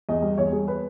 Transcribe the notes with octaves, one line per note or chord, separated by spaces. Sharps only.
E2 D#5
G3
E2 C#5
G3 G#4
B4